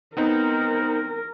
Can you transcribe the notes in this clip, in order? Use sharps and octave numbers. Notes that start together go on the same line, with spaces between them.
B3 C4 D#4 A#4